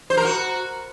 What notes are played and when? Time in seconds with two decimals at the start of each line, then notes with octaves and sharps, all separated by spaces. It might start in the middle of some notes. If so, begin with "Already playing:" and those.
0.10 C5
0.17 A#4
0.25 F#4